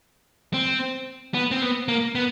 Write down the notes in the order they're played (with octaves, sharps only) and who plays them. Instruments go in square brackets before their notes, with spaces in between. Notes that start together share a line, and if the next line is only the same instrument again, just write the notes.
[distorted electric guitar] C4
B3
C4
B3
A#3
B3